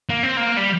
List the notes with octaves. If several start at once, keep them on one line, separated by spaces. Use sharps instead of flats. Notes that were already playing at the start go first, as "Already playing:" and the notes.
A#3
C4
A#3
G3